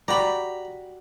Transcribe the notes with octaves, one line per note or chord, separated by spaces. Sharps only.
F#4 G4 D5 A#5 B5